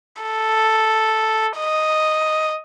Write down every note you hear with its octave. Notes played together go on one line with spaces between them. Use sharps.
A4
D#5